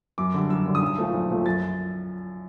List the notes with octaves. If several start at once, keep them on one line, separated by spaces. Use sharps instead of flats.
F#2 D6
D3 G3
F#2 E6
D3 G3
D#6
B1 E6
A#2 F3 A3
B1
A#2 F3 A3
F#2 A6